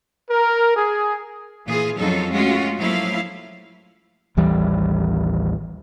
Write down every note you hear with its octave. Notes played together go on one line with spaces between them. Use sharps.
A#4
G#4
A#2 E3 F4 G#4
F2 F#3 C#4 D#4 F4 A4
G#3 A3 C#4 F4 F#4
F3 F#3 A3 A#3 E4 F5
A1 D#2 E3 G3